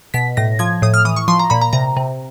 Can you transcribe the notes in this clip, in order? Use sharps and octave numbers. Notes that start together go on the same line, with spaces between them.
B2 B6
A2 A#6
F3 G#6
A2 D#6
F6
E3 D#6
C#6
F3 C6
A#5
A#2 B5
A#5
C3 A#5
C3